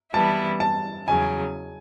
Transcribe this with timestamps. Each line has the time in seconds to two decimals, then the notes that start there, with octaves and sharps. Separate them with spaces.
0.13 E3 G3 B3 E4 A5
0.60 A5
1.07 E2 C#3 F#3 G#5